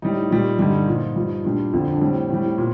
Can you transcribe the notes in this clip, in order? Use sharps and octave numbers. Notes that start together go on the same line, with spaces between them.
A2 G3 D#4
A#2 G3
G2 D3 G3 D#4
A#2 F3
G2 F3
A#2 G3 D4
F2 D3 F3
D4
A2 G3 C4
A2 G3
A#2